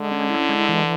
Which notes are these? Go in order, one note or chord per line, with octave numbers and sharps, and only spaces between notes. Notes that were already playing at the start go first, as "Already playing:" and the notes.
Already playing: D3 G#3
C#4
E4
G#3
E3